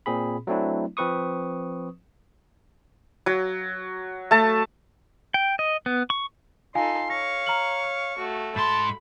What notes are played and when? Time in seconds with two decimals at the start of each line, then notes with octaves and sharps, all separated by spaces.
0.06 A#2 C4 G#4 B5
0.47 F#3 A3 C4 D4 E4
0.97 F3 C4 B4 C#6 D#6
3.26 F#3
4.31 A3 A5
5.34 G5
5.59 D#5
5.86 B3
6.10 C#6
6.75 D#4 F4 A4 F5 G#5 C6
7.10 C#5 F5 C#6 A#6
7.46 A#5 F6 F#7
7.84 F6
8.18 A3 F#4
8.56 G#2 A5 B5 C6